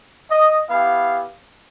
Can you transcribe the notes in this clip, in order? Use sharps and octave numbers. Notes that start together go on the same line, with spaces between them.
D#5
B3 E4 G4 F5